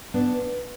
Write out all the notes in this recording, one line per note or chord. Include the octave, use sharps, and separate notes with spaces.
B3 D4